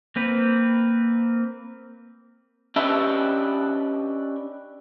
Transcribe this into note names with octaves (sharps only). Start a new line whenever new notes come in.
A#3 C4 B4
C#4 D4 G4 B4 D#5 E5